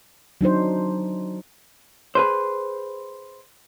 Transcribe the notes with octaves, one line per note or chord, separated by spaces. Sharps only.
F#3 D4 D#4 C5
G#4 B4 C5